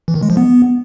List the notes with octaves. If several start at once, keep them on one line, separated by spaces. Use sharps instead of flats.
E3
D#3
G#3
F3
B3